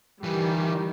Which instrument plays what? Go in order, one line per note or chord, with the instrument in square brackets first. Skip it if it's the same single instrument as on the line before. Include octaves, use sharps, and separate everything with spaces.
[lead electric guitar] D2 E3 [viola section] D#3 G3